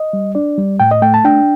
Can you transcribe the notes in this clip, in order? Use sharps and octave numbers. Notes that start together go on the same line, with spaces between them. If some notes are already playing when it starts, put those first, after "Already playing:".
Already playing: D#5
G3
D4 D5
G3
A2 G5
D#5
A3 G5
A5
D4 G5